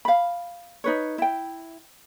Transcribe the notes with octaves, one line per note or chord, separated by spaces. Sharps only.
F5 B5
D#4 B4 C#5
E4 G5